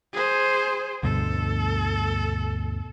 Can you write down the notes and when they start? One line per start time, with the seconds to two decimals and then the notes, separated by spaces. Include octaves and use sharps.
0.13 G#4 C5
1.03 D2 G2 B2 A4